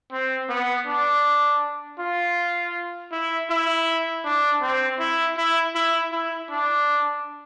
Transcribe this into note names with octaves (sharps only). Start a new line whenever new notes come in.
C4
B3
D4
F4
E4
E4
D4
C4
E4
E4
E4
E4
D4